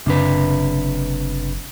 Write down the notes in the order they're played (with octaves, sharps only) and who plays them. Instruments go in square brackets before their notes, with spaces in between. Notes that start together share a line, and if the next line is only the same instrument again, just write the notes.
[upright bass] F#1 [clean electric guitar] C3 D4 B4